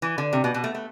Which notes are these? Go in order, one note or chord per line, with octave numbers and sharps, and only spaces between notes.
E3
D3
C3
B2
B2
A3
A3